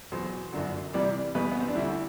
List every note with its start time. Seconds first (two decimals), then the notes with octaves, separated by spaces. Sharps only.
0.12 E2 B2 F#3 C5
0.53 G1 F#2 D3 F#3
0.94 C2 C3 E3 G3 D5
1.35 E2 B2 G3 B4
1.52 B3
1.60 C4
1.68 D4
1.75 D2 D3 G3 E4